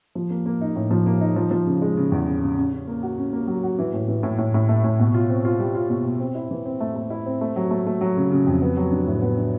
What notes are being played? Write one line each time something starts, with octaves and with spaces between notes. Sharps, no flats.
F3
A#3
A#3
D#4
A2
F3
A#3
D#4
F3
F3
C#3
G#3
C#3
E2
C#3
C#3
C#4
C#4
A#3
F#4
C#4
A#3
F#3
F#4
E3
A2
E3
A2
A2
A2
A3
A2
B2
F4
C4
F4
G3
F4
B2
B2
C4
E4
E3
C4
A3
A3
E4
C4
A3
F#3
A3
A3
F#3
C#3
C#3
F2
B3
F#3
D4
A2
B3
D4